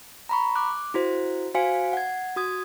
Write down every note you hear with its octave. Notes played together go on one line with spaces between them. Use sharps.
A#5 B5 C#6
D6 F#6
E4 F#4 C5
F#4 C5 F5 G#5 C#7
F#5 G#6
F#4 D#6 G#6